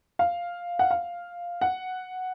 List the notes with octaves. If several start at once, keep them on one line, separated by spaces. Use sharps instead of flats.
F5
F#5
F5
F#5